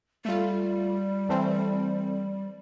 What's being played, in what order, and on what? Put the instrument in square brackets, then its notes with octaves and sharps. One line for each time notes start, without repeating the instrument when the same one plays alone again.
[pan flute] G3 [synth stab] A3 F4
[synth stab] E3 A3 C4